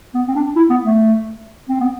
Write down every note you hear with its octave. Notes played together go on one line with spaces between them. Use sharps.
B3
C4
D4
E4
B3
A3
C4
B3